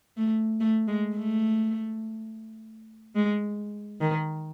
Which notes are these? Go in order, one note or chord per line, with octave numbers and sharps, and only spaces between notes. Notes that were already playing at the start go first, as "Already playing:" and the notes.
A3
A3
G#3
A3
G#3
D#3